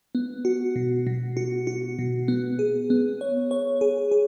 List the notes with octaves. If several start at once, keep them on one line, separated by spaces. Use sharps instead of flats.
B3
F#4
B2
B2
F#4
F#4
B2
B3
G#4
B3
C#5
C#5
G#4
G#4